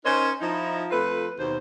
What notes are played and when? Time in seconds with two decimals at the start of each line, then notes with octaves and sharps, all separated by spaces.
0.04 C#4 D#4 A#4 C5 C#5 D#5
0.41 F3 D#4 E4
0.91 F2 A3 F4 B4
1.38 D#2 B2 C5